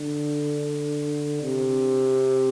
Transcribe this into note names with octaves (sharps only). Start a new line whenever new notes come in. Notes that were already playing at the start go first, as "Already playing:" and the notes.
Already playing: D3
C3